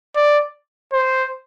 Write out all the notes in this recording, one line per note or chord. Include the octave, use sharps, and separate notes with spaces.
D5
C5